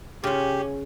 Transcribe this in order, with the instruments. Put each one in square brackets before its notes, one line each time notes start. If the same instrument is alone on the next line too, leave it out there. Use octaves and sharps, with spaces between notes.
[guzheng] C#3 F4 [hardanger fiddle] C#4 [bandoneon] G4